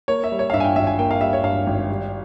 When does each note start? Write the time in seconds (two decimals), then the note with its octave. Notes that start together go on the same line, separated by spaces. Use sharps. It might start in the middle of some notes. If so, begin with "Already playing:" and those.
0.08 A#3 C#5
0.24 E5
0.32 G3
0.39 C#5
0.50 F5
0.53 G2 E5
0.60 G#5
0.64 G5
0.76 G#1 E5
0.87 G#5
0.99 A#3 G5
1.11 F5
1.21 G3 E5
1.33 C#5
1.43 G2 F5
1.67 G#1
1.89 G3